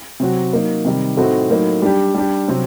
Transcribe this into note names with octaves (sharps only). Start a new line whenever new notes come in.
C3 F#3 C4 F#4
F#3 A#3 D#4
C3 D#3 G3
A2 A3 C4 D#4 F#4
A2 F#3 A#3 D#4
G3 D4 G4
G3 D4 G4
C3 F#3 C4